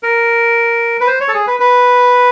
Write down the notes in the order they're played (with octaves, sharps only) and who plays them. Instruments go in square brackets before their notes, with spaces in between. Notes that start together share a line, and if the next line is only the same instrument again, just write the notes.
[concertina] A#4
B4
C5
C#5
A4
G#4
B4
B4